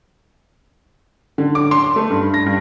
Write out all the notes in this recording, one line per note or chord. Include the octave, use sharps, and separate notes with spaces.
D3
D6
C6
C6
A3
G2
A#6
G2